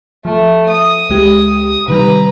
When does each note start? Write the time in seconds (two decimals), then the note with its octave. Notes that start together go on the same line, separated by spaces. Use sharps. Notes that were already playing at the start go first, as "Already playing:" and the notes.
0.25 F3 A3
0.69 D#6
1.10 C#2 G#3 G4
1.88 C3 D#3 G3 B4 A#5